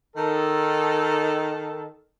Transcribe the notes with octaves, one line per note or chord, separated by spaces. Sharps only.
D#3 A4